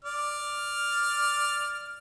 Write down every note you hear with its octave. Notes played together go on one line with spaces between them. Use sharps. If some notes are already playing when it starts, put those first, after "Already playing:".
D5 F6